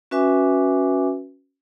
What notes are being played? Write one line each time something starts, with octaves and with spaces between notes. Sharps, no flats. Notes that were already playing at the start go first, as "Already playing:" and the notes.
C#4 F#4 B4 E5 G#5 D6